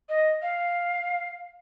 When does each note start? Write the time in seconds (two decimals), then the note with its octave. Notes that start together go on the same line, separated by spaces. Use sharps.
0.09 D#5
0.42 F5